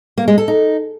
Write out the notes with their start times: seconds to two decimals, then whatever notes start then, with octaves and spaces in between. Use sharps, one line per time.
0.18 A#3
0.28 G#3
0.38 A4
0.48 D#4